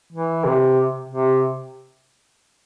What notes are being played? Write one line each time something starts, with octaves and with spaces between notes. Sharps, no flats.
E3
C3
C3